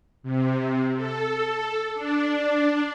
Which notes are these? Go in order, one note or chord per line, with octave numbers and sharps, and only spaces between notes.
C3
A4
D4